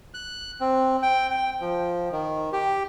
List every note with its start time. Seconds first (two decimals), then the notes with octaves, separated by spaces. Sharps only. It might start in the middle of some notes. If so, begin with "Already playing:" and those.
0.14 F#6
0.61 C4
1.02 G5
1.30 G5
1.61 F3
2.12 D#3
2.53 G4